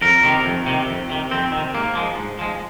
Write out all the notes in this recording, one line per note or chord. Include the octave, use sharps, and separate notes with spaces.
F2 A#4
C3 D#3
F2
C3 D#3
F2
C3 D#3
F2 C4
D#3
C3
G#2 A#3
F3 G#3
G#2
F3 G#3